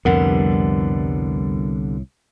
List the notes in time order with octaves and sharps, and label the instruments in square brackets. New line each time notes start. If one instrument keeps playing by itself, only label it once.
[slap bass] C2 A2 [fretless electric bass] F2 [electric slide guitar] D3 G3 B3 [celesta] A#4 F#5